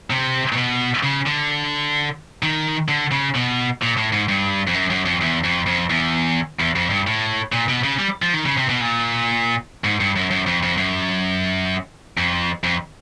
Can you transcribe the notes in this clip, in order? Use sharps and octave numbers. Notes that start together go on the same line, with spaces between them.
C3
A#2
B2
C#3
D3
D#3
D3
C#3
B2
A#2
A2
G#2
G2
F2
F#2
F#2
F2
E2
F2
F2
E2
E2
F2
G2
A2
A#2
B2
C#3
G3
F3
D#3
C#3
C3
B2
A#2
G#2
G2
F#2
F#2
F2
F2
F#2
F2
F2